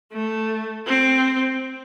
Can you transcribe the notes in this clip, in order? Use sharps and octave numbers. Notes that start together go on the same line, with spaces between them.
A3
C4